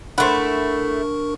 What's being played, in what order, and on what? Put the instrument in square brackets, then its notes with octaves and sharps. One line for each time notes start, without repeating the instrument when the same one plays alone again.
[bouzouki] A3 E4 [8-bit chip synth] D4 A#4 C#6 [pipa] C5 F#5